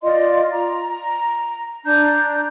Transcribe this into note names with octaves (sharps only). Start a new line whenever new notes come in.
F4 D5 D#5 C6
A#5
D4 A#5 G6